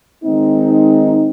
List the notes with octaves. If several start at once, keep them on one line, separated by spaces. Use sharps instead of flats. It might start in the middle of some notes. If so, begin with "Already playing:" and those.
D#3 G#3 C4 D#4